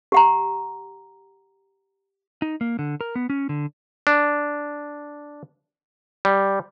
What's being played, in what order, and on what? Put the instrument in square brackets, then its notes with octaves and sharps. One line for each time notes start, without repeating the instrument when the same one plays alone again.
[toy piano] G4 F#5 A#5
[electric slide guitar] D#4
A#3
D3
A#4
B3
C#4
D3
[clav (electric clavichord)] D4
G3